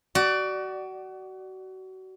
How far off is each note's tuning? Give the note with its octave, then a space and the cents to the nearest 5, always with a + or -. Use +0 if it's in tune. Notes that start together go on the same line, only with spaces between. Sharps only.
F#4 +30 D5 +10